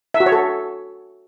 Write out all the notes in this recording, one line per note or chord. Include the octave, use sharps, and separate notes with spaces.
E5
F#4
C#5
A4